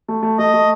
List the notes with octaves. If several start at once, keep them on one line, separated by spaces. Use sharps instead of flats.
A3
A3
A3 D#5
A3